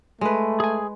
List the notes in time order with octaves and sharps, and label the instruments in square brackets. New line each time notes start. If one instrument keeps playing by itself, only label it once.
[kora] G#3 B4 [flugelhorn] A3
[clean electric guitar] G#4 G#5